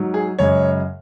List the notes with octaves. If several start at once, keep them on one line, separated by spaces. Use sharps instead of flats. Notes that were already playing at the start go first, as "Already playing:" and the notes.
Already playing: G#2 F#3
G#4
F#2 C#3 G#3 C#5